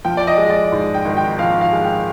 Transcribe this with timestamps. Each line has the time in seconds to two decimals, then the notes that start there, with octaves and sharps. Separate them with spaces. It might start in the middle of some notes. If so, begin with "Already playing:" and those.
0.05 F3 G5
0.17 D5
0.27 D#5
0.38 G#3
0.50 D5
0.72 G#2
0.94 G5
1.05 G#1
1.17 G5
1.39 F3 F5
1.61 F5
1.73 G#3
1.84 G5